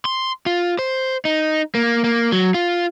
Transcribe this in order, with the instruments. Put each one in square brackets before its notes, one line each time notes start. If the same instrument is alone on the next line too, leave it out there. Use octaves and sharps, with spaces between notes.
[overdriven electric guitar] C6
F4
C5
D#4
A#3
A#3
F#3
F4